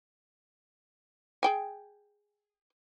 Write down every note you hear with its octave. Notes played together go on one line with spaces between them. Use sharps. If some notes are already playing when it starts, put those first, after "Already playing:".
G#4 G5 G#5